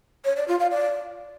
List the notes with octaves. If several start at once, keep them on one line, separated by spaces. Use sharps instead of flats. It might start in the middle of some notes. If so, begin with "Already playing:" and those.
C#5
D5
F4
F5
D5